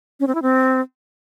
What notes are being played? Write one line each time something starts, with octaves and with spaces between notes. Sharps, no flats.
C#4
C4
E4
C4